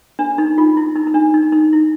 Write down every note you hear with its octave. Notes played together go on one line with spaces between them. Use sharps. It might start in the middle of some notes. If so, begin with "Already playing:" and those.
D4
D#4
F4
E4
D#4
D#4
D4
D#4
D#4
E4